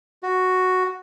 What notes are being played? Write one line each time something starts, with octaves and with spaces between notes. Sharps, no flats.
F#4